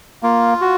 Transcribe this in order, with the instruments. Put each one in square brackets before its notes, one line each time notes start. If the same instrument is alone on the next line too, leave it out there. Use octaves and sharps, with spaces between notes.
[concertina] A#3 [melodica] F4
[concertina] F#4